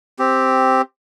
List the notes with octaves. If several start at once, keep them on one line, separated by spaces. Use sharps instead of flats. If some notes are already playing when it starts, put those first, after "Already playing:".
C4 G4